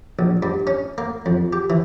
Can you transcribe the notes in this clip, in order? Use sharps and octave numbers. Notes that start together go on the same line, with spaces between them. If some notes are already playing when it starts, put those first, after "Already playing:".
A#1
G2
C#4
A#3
F2
G4
E3